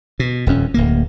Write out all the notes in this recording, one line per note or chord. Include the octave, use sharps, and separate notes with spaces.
B2
D#1 F2 C#4
D1 D2 A#3